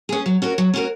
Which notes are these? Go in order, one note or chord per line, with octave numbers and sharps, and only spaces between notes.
C#4 G#4
F#3
C#4 F#4 A#4
F#3
C#4 F#4 A#4